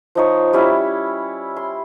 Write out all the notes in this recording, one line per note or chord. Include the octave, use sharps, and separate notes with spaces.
F3 D#4 C#5
G3 C#4 E4
C6